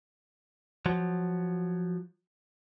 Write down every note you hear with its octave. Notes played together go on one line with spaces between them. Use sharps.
F3 F#3